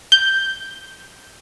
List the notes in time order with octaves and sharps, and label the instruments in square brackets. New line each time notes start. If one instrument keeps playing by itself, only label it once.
[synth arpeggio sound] G6